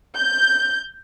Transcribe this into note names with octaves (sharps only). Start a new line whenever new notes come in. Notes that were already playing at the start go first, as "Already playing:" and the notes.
G6